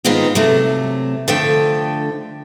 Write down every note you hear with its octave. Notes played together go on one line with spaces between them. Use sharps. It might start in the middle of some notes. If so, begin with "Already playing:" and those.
G#2 D#3 G#3 B3 C4 F4
C3 F#3 A3
D3 F3 A3 G5